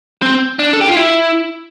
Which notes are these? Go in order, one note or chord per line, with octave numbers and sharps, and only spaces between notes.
C4
D4
A4
G4
F4
E4